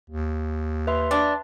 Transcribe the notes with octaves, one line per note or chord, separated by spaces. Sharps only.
D#2
B4 E5 C6
D4